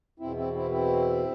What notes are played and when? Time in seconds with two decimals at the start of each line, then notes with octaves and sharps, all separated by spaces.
0.19 E2 B2 C4 E4
0.36 C4 E4
0.54 C4 E4
0.71 C4 E4